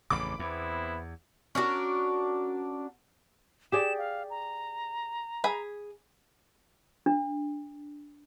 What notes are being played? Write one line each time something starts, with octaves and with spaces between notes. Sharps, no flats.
A1 F2 C#3 B5 D6
E2 B3 C4 E4
C#4 D4 F#4 A#4
G4 G#4 D5 E7
F5
A#5
G#4 B5
D4